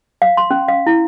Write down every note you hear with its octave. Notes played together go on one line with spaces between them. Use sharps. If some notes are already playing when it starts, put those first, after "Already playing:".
F5
C6
C#4
F5
E4